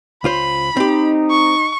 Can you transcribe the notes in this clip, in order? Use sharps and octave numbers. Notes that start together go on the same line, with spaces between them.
C#2 F4 C5 B5
C4 D#4 G4
C#6